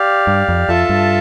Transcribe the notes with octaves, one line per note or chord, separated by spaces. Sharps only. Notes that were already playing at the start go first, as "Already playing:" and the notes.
Already playing: G4 D5 F5
G2
F2
F2 F4 A4 E5 A5
G2